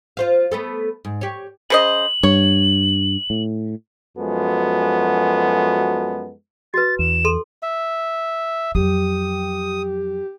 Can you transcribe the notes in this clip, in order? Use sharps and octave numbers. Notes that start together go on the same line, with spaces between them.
F4 C5 F5
A3 B3 A4
G#2
G4 C#5
C#3 C5 D#5 F#7
G2 C#5
A2
F#2 F3 G#3 B3 F#4 A4
F#4 B4 A6
E2 E7
A4 C6
E5
F2 F#3 G4 D#6